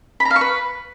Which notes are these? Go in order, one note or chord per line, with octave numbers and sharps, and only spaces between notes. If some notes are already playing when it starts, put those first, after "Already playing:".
B5
A#5
F5
C#6
B4